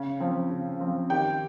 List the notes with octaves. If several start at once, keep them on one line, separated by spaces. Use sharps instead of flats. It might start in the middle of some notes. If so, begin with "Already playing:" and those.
Already playing: C#3
F3 C4
C#3
F3 C4
D#3 G4 G5